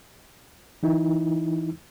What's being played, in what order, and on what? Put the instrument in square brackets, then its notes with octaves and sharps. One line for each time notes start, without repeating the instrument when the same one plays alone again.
[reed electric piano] E3 D#4 E4